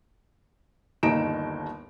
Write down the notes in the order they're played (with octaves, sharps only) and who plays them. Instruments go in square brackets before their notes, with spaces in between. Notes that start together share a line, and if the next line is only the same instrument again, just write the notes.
[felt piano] G1 D#2 D#4 A#5 D7 E7